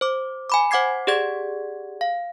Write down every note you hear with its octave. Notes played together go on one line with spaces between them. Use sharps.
C5 D6
G#5 B5 D6
C5 F#5 D6 G#6 C7
G4 G#4 D5 F#5 G#6
F5